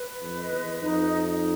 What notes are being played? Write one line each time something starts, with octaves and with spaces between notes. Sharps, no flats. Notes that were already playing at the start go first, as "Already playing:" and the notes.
Already playing: B4
F2
D#5
E2
F2 D#4
D#4